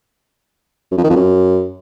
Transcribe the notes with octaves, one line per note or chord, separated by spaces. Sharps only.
F#2
F2
D#3
F2
F#2